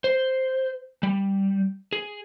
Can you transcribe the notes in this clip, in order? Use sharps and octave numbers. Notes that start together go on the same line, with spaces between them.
C5
G3
G#4